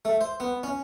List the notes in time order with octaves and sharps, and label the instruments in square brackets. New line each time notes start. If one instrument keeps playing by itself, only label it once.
[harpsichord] A3
C5
B3
C#4